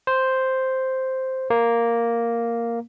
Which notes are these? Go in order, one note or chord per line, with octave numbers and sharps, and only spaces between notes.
C5
A#3